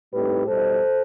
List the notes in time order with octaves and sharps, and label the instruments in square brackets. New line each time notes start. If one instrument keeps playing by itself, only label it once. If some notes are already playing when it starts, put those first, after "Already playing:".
[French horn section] A2 G3 C4 D#4 G4 B4
B2 G3 D#4 A4 C5